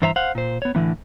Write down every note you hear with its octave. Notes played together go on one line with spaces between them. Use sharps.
G2 E3 C5 E5 A5 A#5
C5 F5 F#5
A#2 C5
B3 C#5
A2 D3 E3 B3